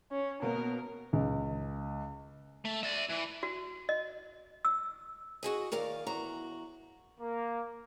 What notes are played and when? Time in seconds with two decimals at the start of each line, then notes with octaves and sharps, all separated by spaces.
0.10 C#4
0.42 B2 A#3 B3 A#4
1.13 C#2
2.65 A3
2.83 D5 E5
3.10 E3
3.43 F#4
3.89 D#5
4.65 E6
5.43 F#4 G#4 D#5
5.72 D#2 A#4 D5 F5
6.07 E2 F#4 A#5
7.19 A#3